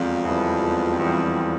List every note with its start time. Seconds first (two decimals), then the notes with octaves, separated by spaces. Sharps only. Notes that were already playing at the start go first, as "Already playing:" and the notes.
Already playing: E1 F2
0.25 E2 E3 G3
0.62 E1
0.99 E2 E3 G3